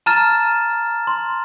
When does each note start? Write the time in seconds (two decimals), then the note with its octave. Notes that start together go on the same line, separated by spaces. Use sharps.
0.06 A5 A#5 F6 A6 E7
1.07 C6